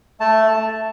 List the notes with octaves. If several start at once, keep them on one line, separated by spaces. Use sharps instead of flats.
A3 A5